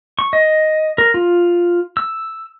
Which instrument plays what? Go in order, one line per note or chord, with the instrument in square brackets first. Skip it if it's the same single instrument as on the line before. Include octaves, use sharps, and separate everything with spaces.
[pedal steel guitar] C#6
D#5
A#4
F4
E6